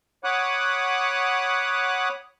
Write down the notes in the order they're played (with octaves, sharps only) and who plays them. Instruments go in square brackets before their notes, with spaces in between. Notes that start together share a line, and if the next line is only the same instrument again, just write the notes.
[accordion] C#5 F#5 B5 D6 D#6 F#6